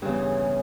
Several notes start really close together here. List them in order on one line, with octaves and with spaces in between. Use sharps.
G2 C#3 E2